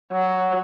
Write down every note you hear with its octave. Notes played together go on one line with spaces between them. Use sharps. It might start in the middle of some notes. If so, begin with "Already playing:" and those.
F#3